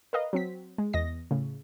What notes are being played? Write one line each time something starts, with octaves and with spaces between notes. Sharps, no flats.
A#4 B4 D#5 F5
F#3 C4 B6
G#3
E2 D#5 A#6
A2 C#3